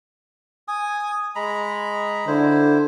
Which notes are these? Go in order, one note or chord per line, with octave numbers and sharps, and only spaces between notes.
G#5 D#6
G#3 A#5 B5
D3 E4 C5